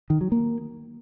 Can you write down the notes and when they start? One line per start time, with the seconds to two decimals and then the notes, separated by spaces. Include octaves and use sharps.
0.10 D#3
0.21 F#3
0.32 A#3